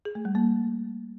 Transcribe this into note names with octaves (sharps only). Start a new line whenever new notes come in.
G#4
A3
G3
A#3